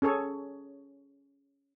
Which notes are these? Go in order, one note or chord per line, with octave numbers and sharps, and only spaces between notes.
C#4 G#4 A4 C#5